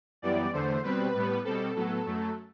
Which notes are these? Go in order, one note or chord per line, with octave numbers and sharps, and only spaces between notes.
F#2 E3 G3 B3 D5
E2 D3 A3 C5
B2 G3 C4 B4
A2 G3 B3
B2 G3 C4 A4
A2 F#3 B3 A4
F#2 F#3 A3